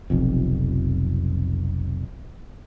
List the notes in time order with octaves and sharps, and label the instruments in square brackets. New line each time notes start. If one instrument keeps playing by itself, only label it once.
[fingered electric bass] F1 B1 F2